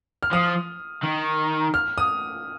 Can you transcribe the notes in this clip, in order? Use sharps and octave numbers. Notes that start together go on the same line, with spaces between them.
F6
F3 D#6
D#3
F6
D#6